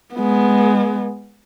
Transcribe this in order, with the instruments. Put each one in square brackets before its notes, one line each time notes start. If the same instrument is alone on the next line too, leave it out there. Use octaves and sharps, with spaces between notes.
[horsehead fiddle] G#3 B3